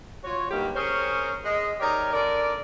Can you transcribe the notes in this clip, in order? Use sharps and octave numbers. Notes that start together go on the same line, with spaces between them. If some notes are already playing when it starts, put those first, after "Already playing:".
F4 F#4 C#5
G2 F#3 A#3 D#4 G4
C#4 G#4 A#4 C5 C#5
G#3 D#5
D#4 G4 A#4 C#5 D5
D3 A#4 D5